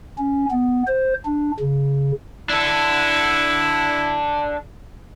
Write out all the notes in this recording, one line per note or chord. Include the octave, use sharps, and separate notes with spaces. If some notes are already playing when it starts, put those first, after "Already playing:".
C#4
B3
C5
D4
C#3
D4 E4 A4